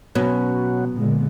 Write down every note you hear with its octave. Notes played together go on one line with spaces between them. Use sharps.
B2 F#3 B3 C#4
A#2 D3 G#3